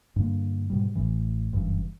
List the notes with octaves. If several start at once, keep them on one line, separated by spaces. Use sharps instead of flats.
G2 D3 A#3
G#2 B2 G3
A1 A2 E3
F#1 G2 E3